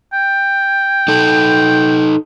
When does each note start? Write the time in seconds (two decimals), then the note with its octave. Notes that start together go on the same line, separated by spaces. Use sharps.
0.14 G5
1.08 D#4 A4